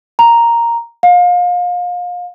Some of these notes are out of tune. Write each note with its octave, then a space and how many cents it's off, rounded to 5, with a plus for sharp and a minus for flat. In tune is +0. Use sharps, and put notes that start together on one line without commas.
A#5 +0
F5 +30